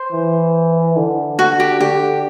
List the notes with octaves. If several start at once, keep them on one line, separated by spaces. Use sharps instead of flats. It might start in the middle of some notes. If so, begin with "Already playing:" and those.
Already playing: C5
E3
D3
F#4
G4
D3 G4